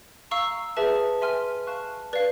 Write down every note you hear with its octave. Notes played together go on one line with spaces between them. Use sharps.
F5 A#5 C#6 E6
G#4 B4 E5 A5
B4 E5 G#5 C6 F6
F5 A5 C#6 F#6
B4 D5 F5